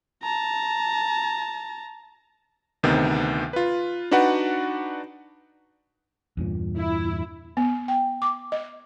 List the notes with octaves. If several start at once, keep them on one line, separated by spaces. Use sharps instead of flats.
A5 A#5
D2 C3 D#3 B3
F4 B4
D4 D#4 F#4 B4 D5 F#5
E2 G2 A#2
E4
B3
G5
D6
D#5